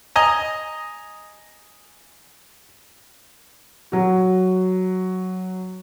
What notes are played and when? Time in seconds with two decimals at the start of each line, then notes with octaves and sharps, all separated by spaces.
0.16 D#5 G#5 A#5
3.92 F#3 F#4